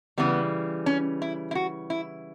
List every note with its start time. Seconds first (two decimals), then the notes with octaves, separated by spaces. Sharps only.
0.18 C#3 E3 G3 B3
0.86 C#4
1.22 E4
1.51 E4
1.55 F#4
1.90 E4